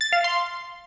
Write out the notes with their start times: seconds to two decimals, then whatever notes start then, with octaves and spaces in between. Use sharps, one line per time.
0.01 A6
0.12 F5
0.24 C6